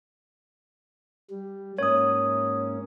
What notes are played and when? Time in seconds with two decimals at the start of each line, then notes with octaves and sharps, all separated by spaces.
1.30 G3
1.78 G#2 A#3 C#4 C#5 D#6